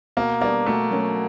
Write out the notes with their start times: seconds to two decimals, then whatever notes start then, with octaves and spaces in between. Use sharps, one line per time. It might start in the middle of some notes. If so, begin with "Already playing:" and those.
0.17 B2 A#3
0.41 G3 A#3 B3 D4
0.66 B2 A3
0.91 F#3 A#3 C#4